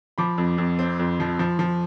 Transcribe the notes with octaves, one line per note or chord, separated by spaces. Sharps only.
F3 B5 D6
F2
F2
C4
F2
F3
F3
F3